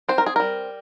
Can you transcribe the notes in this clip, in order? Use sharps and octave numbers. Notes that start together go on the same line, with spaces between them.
C4 C5
A#4
G#4
G3 A#4